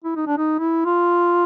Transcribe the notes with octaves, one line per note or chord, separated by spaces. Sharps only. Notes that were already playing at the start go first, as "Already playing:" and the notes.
E4
D#4
D4
D#4
E4
F4